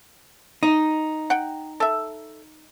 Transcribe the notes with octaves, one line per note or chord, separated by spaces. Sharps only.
D#4
F#5 G5
A4 E5